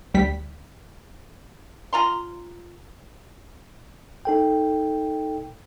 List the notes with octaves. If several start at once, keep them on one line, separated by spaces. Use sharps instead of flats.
D2 G3 B6
F4 A#5 C6
D#4 A4 G5